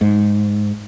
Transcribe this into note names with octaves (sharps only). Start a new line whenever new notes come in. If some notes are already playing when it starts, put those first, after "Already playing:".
G#2